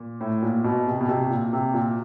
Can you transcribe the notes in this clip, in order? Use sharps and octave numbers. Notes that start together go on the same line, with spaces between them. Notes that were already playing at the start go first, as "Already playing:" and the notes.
Already playing: A#2
A2
A#2
B2
C3
B2
C3
A#2
C3
A#2